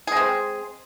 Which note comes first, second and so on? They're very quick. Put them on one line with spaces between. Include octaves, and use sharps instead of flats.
G#4 G#3 C4